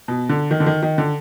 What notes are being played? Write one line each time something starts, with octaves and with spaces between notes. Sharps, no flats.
B2
D3
D#3
D3
D#3
D#3
D3